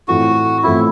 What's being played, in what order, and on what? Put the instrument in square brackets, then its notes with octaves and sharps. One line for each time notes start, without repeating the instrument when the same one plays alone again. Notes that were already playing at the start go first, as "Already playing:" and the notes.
[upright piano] A2 E3 A3 C4 F4 [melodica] F#4
[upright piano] A2 E3 A3 C4 F4 [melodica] E4